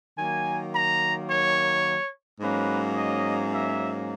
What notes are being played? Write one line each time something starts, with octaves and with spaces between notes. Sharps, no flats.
D#3 F#3 A#3 G#5
A#5
C#5
G#2 F#3 A#3 C#4 B4
D#5
E5